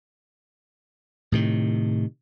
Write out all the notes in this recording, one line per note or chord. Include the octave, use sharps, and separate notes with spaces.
A2 C3 D#3